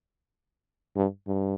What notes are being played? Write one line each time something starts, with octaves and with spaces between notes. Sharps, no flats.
G2
G2